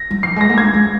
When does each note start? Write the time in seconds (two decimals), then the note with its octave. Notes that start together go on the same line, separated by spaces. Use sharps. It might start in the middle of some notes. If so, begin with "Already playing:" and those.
Already playing: A#6
0.11 G3
0.23 F3 C7
0.36 G#3 A#6
0.49 A#3
0.58 G#3 G#6
0.74 G#3